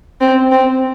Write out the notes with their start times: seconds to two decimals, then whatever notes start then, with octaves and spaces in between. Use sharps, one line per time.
0.21 C4
0.51 C4